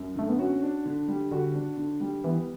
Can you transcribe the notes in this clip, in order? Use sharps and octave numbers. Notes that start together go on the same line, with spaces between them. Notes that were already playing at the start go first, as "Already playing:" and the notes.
Already playing: F#2
D3 A3
B3
C#4 F#4
D4
D3
G3
D3 F#4
D4
D3
G3
E3 B3